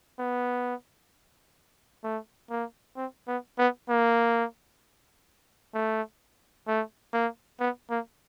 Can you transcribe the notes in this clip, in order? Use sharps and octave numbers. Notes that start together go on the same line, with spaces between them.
B3
A3
A#3
C4
B3
B3
A#3
A3
A3
A#3
B3
A#3